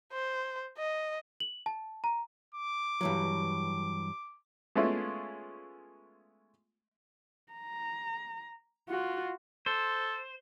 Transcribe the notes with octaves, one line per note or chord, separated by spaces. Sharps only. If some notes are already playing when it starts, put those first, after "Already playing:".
C5
D#5
F#7
A5
A#5
D6
G2 E3 F#3
G#3 A3 B3 C#4 E4 F4
A#5
F4 F#4
A4 C5